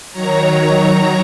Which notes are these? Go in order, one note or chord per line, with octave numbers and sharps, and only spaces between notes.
D#3 F#3 C#5 A#5